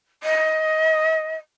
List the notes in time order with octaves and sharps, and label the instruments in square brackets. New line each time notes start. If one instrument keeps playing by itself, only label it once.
[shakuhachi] D#5